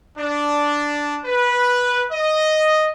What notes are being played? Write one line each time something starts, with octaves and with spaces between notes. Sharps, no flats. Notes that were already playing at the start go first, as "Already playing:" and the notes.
D4
B4
D#5